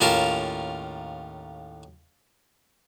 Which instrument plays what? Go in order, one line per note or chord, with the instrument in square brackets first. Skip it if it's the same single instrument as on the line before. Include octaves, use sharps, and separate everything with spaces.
[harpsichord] D#2 A2 C#4 F4 A#4 A5